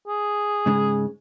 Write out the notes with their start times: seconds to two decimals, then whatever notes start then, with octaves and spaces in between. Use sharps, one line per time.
0.07 G#4
0.66 G#2 C#3 G#3